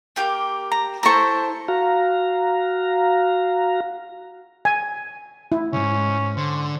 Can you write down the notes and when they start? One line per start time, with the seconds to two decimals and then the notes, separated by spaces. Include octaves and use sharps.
0.16 A#3 G4 A#4
0.71 A#5
1.03 E4 A4 C5 A#5 C#6
1.68 F#4 F5 A#5
4.65 G#5
5.52 E4
5.73 C#2 G#2 C#4
6.37 D3 C5